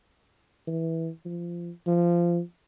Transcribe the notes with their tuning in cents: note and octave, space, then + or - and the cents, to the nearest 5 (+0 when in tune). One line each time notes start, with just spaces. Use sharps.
E3 -10
F3 -20
F3 -15